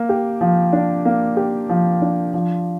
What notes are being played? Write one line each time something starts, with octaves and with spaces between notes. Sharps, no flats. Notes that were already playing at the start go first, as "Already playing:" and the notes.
Already playing: A#3
G4
F3
D4
A#3
G4
F3
D4
F3